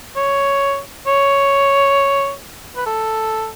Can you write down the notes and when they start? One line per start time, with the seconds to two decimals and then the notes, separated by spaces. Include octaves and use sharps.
0.16 C#5
1.07 C#5
2.76 B4
2.86 A4